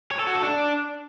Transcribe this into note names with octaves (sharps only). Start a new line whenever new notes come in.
C#5
A4
F#4
A4
D4